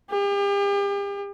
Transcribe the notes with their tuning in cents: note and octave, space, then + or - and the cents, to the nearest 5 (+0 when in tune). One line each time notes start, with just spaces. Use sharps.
G4 +40